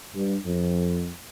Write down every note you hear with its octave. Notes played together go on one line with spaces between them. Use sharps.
G2
F2